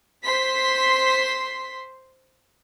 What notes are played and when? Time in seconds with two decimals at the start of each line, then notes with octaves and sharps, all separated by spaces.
0.23 C5 C6 B6